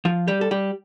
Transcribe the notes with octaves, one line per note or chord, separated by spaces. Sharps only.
F3 F4
G3 G4
A4
G3 G4